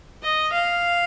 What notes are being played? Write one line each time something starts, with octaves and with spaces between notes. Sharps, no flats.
D#5
F5